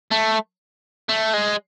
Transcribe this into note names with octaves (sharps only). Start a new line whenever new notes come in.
A3
A3
G#3